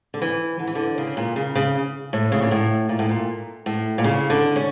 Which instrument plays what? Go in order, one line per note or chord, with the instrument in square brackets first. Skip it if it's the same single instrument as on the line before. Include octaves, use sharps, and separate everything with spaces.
[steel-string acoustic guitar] D3
E3
D3
E3
D3
C#3
A#2
C#3
C#3
A2
C#3
A#2
A2
A#2
A2
A#2
A2
A#2
C#3
D3
C#4